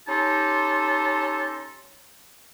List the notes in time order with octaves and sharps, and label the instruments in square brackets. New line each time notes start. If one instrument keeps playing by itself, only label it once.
[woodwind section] C#4 D#4 G4 A4 A5 C6